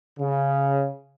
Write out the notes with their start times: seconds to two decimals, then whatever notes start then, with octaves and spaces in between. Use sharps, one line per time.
0.19 C#3